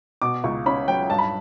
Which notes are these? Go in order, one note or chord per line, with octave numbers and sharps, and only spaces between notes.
B2 D6
C#2 C#6
C#4 B5
F#3 G5
G2 A5
B5